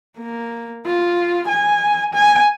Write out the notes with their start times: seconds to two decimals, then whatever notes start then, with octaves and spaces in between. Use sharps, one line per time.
0.18 A#3
0.86 F4
1.48 G#5
2.14 G#5